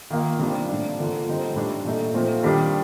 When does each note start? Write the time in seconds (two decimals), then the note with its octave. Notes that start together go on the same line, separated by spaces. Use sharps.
0.11 D#3 A#3 F4
0.39 C3 G3 D4
0.69 A2 F3 A#3 D4
0.98 D3 F3 A#3 F4
1.27 D3 G3 C4 D#4
1.55 A2 G3 D4
1.85 A#2 A3 D#4
2.14 A#2 F3 A3 C4
2.43 D#3 G3 D4